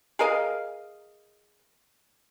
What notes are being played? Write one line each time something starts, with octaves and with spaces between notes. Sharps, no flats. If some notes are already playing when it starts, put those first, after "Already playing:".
G#4 A#4 D#5 F5